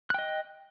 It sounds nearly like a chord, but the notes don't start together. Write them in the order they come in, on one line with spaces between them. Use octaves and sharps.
F#6 G5 D#5